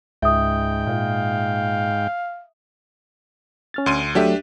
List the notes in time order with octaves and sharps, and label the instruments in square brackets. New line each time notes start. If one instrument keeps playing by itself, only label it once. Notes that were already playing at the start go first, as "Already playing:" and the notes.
[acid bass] C#2 [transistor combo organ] G#2 G5 [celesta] E5 D#6
[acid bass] A#2 [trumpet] F5
[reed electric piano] C#4 F6 A6
[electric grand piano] D2 C6 D#7
[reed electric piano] F#3 A3 [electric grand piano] D4 G4 E5